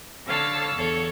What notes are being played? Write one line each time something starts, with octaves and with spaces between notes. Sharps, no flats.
D3 A4 C#5 F5 A5 E6
E2 A4 C#5